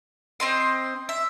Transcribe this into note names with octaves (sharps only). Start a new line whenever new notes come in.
C4 D#5 C6
E5